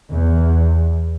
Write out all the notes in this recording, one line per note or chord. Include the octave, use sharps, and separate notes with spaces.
E2